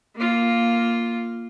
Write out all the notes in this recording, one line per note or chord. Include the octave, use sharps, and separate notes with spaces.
A#3 F4